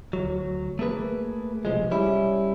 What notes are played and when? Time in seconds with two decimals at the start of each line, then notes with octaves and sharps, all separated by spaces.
0.13 D2 F#3
0.79 A3 A#3 G#4 B4
1.65 B1 C3 F3 G#3
1.91 G3 C#4 E4